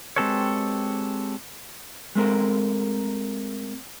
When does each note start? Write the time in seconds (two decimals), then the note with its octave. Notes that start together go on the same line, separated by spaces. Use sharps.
0.16 G#3 C4 G4 A4 B4 C#5
2.15 G#3 A3 C4 A#4